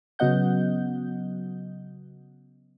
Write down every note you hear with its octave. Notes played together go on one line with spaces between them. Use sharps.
C#3 F#3 B3 D#5 F#5 G6